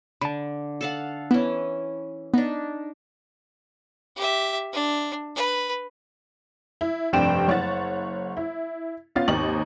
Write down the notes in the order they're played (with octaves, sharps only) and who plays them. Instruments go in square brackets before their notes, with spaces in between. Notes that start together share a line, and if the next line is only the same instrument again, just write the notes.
[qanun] D3 [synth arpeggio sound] A5 B5
[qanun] A4 F5 F#5
[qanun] E3 C#4 [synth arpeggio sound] B3
[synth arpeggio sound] B3 [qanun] D4 D#4
[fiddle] G4 E5
D4
B4
[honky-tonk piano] E4
F1 G2 C4 D5 G5 E7
F#1 C#5 F#5 A6
E4
B3 C#4 F4 F5 A6
G#1 D#2 D#4 C#6 F#7